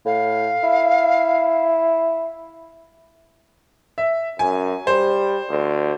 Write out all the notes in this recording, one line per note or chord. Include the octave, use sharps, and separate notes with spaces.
A2 F5
E4
E5
F#2 G#5
G3 C5
D2